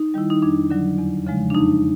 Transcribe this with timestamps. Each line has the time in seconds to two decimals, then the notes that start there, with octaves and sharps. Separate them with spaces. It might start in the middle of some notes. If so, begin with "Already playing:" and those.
Already playing: D#4
0.14 D#3 G3 E4
0.30 D#4
0.42 F2 D4
0.71 D3 F#3
0.98 E2
1.27 C#3 F3 G#3
1.50 D4
1.55 F2 D#4